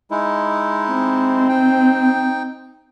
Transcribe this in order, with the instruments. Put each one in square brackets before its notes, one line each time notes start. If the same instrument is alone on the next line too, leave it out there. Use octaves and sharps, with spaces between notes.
[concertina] G#3 D#4 E4
[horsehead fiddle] C4
[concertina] D#4 G5